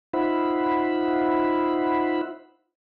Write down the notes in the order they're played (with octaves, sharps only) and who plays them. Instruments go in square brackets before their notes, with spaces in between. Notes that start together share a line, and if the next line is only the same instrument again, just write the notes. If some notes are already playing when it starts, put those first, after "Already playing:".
[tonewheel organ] D#4 F4 C5 E5 F#5 B5